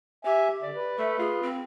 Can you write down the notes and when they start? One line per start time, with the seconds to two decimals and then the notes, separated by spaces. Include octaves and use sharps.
0.25 G4 E5 G#5
0.62 D3 D5
0.75 B4
0.98 A3 E5
1.19 F4 G#4
1.43 C4